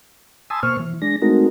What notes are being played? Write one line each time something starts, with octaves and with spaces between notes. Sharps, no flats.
G#5 A5 B5 C6 D#6 E6
B2 A#3 C5 C#6 F6
E3
G#3 D4 A#6
G#3 A3 C4 D#4 F#4 A#4